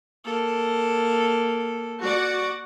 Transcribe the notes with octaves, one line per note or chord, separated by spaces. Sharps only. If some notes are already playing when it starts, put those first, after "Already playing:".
A#3 A4
F#4 D5 F#5